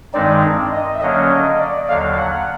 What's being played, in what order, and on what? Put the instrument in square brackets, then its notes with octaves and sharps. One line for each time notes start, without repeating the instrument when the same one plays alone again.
[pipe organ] G2 D#3 G#3 C4 D#4 [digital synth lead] D5
[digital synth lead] D#5
E5
[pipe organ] D3 F#3 A#3 C#4 [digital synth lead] D#5
[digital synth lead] D#5
D5
[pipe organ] D#2 D3 F#3 [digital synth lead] F5
[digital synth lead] F#5